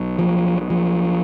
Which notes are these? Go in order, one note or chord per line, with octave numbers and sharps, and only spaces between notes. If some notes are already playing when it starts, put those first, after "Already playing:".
Already playing: B1 B2
F3
F3